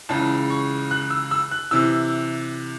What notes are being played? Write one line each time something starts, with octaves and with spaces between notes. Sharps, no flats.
C#2 C#3 E3 A5
C#6
F#6
E6
E6
F#6
C3 E3 E6